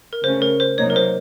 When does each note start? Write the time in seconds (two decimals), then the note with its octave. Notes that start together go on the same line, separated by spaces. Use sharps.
0.13 A#4
0.23 C#3 A3 C#4 C5
0.42 A#4
0.60 C5
0.78 C3 F#3 A#3 D#4 C#5
0.90 A#4
0.96 C5